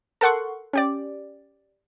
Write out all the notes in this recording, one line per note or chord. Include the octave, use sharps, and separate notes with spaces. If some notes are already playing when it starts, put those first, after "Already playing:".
A4 A#4 F#5 C6 C#6
C#4 G4 D5